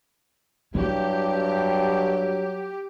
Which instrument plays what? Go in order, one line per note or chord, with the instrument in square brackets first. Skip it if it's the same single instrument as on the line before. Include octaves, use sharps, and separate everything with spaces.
[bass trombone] G2 [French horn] F#3 [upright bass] E4 [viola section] G4